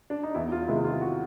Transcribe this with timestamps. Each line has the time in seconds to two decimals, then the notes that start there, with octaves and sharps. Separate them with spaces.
0.10 D4
0.23 D#4
0.34 E2 E4
0.52 F4
0.68 C3 D#3 G#3 E4
0.85 F4
1.01 F#4